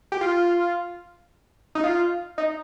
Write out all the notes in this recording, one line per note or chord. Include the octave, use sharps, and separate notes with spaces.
G4
F4
D#4
F4
D#4